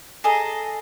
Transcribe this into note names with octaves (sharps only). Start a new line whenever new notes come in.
G#4 A4 D#5 A#5